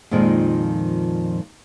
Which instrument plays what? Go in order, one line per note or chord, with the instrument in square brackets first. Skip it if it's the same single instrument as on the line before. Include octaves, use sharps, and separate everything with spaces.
[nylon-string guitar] F2 A#2 D#3 F3 G#3 D#4